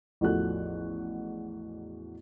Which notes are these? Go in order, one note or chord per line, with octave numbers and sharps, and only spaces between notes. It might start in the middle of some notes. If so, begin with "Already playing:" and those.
A1 E2 F3 F#4 A4 F#6